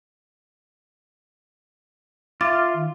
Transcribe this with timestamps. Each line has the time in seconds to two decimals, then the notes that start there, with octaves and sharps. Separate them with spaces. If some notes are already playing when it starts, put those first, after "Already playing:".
2.41 F4 E5 D6 A6
2.74 D#3